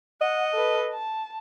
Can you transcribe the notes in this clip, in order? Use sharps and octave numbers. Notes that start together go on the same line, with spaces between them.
D#5 F#5
A4 B4
A5